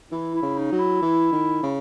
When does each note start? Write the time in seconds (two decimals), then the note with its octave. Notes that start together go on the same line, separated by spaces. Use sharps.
0.11 E3 E4
0.35 E4
0.42 C#3
0.58 D#4
0.72 F#3
0.79 E4
1.02 E3
1.32 D#3
1.63 C#3